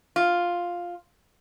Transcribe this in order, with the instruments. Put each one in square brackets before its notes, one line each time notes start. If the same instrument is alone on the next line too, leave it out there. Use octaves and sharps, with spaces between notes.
[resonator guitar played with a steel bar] F4